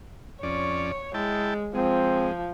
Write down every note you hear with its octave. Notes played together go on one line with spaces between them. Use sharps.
F2 C#4 C#5 D5
G#3 E4 G5 A5
F3 G#3 C4